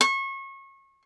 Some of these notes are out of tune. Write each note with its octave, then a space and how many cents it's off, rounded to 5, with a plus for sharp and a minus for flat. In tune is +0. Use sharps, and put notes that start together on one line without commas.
C#6 -30